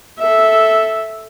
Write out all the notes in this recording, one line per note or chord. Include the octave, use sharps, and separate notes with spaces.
A4 E5